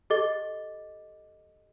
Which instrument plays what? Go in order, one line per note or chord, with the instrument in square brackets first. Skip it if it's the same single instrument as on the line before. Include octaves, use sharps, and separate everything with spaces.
[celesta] G4 A4 D#5 D6 A6 G7